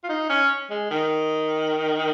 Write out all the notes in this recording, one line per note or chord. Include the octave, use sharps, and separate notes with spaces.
F4
D#4
C#4
G#3
D#3